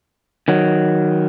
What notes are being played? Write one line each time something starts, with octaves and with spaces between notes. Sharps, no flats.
D#3 F#3